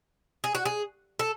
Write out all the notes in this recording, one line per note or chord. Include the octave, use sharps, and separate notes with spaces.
G#4
F#4
G#4
A4